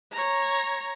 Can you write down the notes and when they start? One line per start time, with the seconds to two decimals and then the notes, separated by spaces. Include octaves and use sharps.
0.12 C#5 A#5